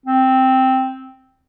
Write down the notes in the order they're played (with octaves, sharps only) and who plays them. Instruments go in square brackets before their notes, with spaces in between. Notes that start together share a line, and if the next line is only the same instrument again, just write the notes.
[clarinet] C4